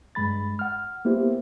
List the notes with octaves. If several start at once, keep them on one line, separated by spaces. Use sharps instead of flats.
G2 G#3 B5 A6
F#5 F6
A#3 B3 E4 G4 C5